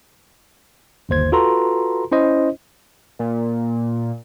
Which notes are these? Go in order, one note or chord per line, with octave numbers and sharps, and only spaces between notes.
G1 D#2 C5 G#6
F4 F#4 A4 B4 A#5 C6
C#4 E4 C5 D#5
A#2